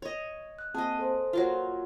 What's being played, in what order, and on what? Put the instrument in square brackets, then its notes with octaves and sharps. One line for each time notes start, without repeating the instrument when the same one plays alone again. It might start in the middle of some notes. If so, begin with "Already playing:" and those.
[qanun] C#5 D#5
[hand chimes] F#6
[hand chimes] A#3 C4 A5 [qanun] G#4 D#5
[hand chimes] A4 C5
[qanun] F#3 A#3 F4